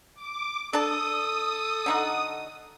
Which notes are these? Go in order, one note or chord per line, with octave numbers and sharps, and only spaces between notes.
D6
D4 A4 A5 D#6
D3 D#4 F#4